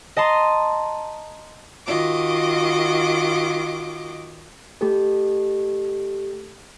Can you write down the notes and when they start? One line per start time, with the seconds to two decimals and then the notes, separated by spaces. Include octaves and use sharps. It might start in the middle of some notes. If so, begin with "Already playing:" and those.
0.16 D#5 A5 A#5 C6
1.86 D#3 F4 F#4 D#5 D6
4.81 A3 G4 A4